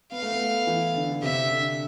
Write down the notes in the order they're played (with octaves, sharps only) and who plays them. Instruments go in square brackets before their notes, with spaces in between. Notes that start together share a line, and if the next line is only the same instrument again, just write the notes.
[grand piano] B3 [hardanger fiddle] F5
[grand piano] A3
B3
E3
D3
D3
[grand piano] C3 [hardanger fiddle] E5
[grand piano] D3